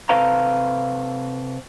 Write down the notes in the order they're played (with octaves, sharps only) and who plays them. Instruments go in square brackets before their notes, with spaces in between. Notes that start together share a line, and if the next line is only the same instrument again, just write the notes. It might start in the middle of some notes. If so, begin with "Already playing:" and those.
[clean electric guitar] C3 A4 B4 C5 F5 A#5